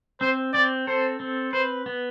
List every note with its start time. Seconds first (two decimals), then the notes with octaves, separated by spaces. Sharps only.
0.21 C4 C5
0.53 C4 D5
0.87 A4 C5
1.20 C4
1.53 B4 C5
1.86 B3